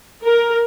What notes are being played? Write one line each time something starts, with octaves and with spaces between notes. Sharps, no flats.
A#4